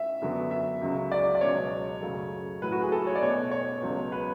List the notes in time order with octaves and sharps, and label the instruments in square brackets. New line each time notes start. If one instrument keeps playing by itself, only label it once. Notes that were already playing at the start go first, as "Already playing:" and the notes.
Already playing: [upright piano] E5
F#2 D3 F#3 B3
E5
C#2 C#3 F#3
D5
D5
C#2 B2 F#3 B3 C#5
F#2 C#3 F#3 A3
A2 F#3 A3 B4
F#4
G#4
A4
C#5
D5
B2 A3 C#5
C#5
C#2 B2 F#3
B4